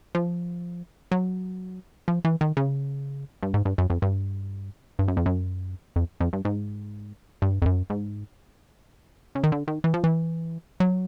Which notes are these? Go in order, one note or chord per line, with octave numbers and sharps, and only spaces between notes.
F3
F#3
F3
E3
D#3
C#3
G2
G#2
G2
F#2
F2
G2
G2
F#2
F2
F#2
F2
F2
G2
G#2
G2
F2
F#2
G#2
C#3
D#3
D3
D#3
E3
F3
E3
F#3